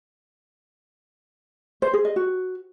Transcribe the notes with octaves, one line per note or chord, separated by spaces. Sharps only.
C5
G#4
D#5
F#4